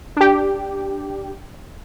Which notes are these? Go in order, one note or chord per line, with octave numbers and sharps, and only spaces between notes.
D4 G4